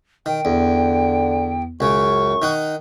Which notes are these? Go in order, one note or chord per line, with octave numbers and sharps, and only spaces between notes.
D#3 G5
E2 D3
C#2 F#2 C#3 C#6
D#3 D#4 F#5